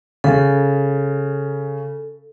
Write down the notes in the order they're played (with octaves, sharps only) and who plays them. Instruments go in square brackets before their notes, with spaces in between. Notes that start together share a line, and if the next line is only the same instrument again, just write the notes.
[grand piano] C#3 [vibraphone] A4